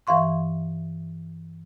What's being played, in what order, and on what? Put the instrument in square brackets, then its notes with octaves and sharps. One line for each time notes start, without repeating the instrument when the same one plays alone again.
[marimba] G2 E3 E5 F5 C6 C#6